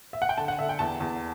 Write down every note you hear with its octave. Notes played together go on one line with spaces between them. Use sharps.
E5
F#5
G5
D3 A5
F#5
D3 E5
G5
E2 A5
E2